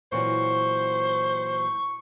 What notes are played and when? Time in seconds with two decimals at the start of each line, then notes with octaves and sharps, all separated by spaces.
0.12 A#2 E3 F#3 C5 C#6